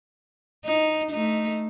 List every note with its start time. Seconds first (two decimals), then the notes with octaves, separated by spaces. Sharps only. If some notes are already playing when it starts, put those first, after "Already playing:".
0.65 D#4
1.11 A3 D#4